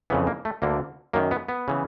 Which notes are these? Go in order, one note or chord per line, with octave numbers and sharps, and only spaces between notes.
F2 C#3 E3 B3
A#3
A3
D2 D3 A#3
F#2 D#3 A#3
B3
B3
C#3 E3